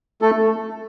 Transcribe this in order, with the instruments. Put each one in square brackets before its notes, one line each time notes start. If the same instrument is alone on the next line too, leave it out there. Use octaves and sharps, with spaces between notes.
[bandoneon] A3 A4